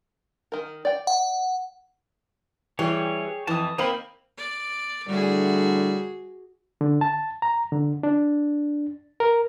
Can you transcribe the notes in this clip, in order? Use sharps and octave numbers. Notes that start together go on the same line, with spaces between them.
D#3 A#4
D5 G5
F#5
E3 G3 G4 G#4 C#5
F2 E3 A5 D#6
A#3 C4 D#4 B5 G6
D5
A2 D3 G3 F#4 G#4
D3
A5
A#5
D3
D4
A#4